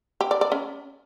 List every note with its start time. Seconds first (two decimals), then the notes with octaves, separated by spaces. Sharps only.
0.21 G4
0.31 D5
0.41 D5
0.52 C#4